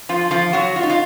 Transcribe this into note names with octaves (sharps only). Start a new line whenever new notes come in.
F3 F4
F3 F4
F#3 F#4
F4
D#4
F4